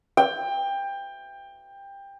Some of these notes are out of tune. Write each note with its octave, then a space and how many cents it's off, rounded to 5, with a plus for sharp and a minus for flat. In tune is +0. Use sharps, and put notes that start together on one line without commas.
G5 +20